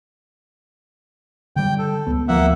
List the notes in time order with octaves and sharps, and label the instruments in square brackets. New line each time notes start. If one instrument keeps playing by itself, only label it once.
[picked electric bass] D3 G3 [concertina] G5
[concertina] A4
[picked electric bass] C#2 B3
[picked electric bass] D2 F3 B3 [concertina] A#3 E5 F#5